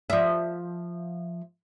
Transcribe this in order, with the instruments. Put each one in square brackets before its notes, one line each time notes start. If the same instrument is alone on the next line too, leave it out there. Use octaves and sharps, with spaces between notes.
[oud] F3 E5